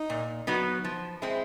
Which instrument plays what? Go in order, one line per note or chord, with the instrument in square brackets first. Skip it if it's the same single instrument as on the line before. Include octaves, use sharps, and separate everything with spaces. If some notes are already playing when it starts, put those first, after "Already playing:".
Already playing: [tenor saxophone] D#4
[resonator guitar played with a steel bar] A#2
F#3 B3 D#4 F#4
F3
G#3 C4 E4